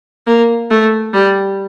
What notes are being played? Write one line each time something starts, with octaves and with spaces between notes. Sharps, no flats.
A#3
A3
G3